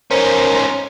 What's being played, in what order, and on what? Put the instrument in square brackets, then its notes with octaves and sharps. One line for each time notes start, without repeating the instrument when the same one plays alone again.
[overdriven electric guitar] C#4 D#4 [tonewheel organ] A#4 C5